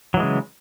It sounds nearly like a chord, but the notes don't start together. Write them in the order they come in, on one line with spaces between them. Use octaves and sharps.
F#3 E3 G#3 C#3